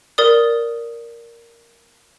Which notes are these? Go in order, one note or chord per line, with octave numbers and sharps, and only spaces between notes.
A#4 D5 D#6